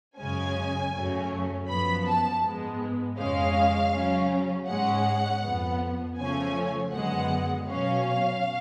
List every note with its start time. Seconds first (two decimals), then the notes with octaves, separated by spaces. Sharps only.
0.18 F#2 C#3 G#3 C#4 G#5
0.94 F#2 C#3 F#3 A3 C#4
1.68 F#2 F3 B3 B5
2.06 A5
2.42 G#2 G#3 B3
3.17 F2 C#3 G#3 C#4 F5
3.93 C#3 F#3 C#4
4.68 G#2 G#3 C#4 F#5
5.42 F2 F3 B3
6.17 C#3 F3 A3 C#4 G#5
6.92 F#2 D3 G#3 B3 F#5
7.68 B2 F#3 C#4 F5